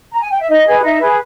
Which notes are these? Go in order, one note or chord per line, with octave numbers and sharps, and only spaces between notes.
A#5
G#5
G5
E5
D#4 D#5
G#4 B4
D#4 E5
G#4 B4